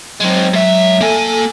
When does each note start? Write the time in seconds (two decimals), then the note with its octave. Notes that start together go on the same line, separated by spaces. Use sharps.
0.20 F#3 G#3 C4
0.53 G#2 E5
1.01 A#3 A4 G#5